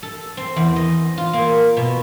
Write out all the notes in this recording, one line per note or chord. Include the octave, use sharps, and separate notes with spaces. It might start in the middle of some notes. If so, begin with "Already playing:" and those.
A4
C4
E2
D#5
F4
A#3
B2